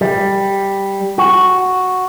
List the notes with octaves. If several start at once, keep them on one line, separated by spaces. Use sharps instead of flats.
G3
F#4